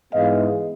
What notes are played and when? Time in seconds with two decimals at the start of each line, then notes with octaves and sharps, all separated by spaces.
0.13 G#2 E3 G#3 B3 D#5 F5